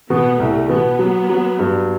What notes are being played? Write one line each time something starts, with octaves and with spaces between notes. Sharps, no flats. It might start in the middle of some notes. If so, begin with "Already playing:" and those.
B2 B3
C2 A3
B2 B3
F#3
F#3
G2